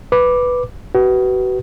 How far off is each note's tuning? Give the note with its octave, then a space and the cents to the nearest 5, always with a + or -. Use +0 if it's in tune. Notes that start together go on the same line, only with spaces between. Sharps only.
B4 +0 D6 +0
F#4 +35 B4 +0